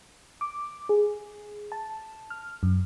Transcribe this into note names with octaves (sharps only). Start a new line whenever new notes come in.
D6
G#4
A5
F6
F#2